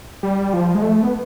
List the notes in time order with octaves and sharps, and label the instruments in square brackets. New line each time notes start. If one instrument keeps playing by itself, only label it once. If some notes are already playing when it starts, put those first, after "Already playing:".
[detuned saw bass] G3
F3
G#3
A3
B3